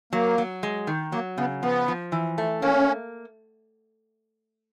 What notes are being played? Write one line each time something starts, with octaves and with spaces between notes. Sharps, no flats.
F#3 A#3
F#3
G#3
D#3
F#3 A#3
C#3 B3
F3 B3
F3
E3
A3
A#3 C#4